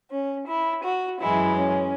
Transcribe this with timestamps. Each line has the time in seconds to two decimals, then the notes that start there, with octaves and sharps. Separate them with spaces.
0.10 C#4
0.47 E4
0.83 F#4
1.20 F#2 E3 G#3 E4
1.57 C#4